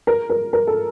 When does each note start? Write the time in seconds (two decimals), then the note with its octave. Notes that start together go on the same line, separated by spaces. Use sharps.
0.07 A#4
0.30 A#4
0.53 A#4
0.67 A4